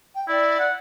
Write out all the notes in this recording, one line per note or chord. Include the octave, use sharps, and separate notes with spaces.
G5
E4 D5
F#5